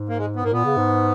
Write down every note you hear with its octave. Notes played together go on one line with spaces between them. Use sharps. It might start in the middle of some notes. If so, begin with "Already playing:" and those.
Already playing: G#2
A#3
G#3
B3
G#2 A#3
A#2 B3
C#3
G#2